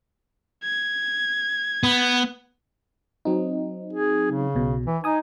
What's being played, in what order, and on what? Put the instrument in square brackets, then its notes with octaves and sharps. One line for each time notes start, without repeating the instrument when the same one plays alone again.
[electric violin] G#6
[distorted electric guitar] B3
[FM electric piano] F#3 C4 D#4
[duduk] G#4
C#3
[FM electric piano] B1 B2
[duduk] E3
[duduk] D#4 [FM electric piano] G#5 D#6